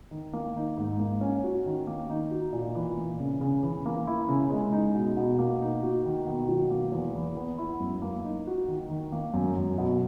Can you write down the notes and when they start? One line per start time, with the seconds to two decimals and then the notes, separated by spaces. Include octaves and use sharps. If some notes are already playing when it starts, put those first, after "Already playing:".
0.11 D#3
0.33 A#3
0.56 D#4
0.77 G#2
0.99 A#3
1.21 C#4
1.44 F#4
1.66 D#3
1.87 A#3
2.10 D#4
2.31 F#4
2.53 A#2
2.75 E3
2.97 A#3
3.19 C#3
3.41 C#3
3.63 E3
3.86 A#3
4.07 E4
4.28 C#3
4.51 G#3
4.72 D#4
4.94 B2
5.17 B2
5.39 A#3
5.61 D#4
5.83 F#4
6.05 D#3
6.27 B2
6.49 F#3
6.71 A#3
6.92 E2
7.15 E3
7.37 B3
7.58 E4
7.80 F#2
8.02 A#3
8.24 D#4
8.47 F#4
8.68 D#3
8.90 D#3
9.12 A#3
9.34 F#2
9.56 F#2
9.78 B2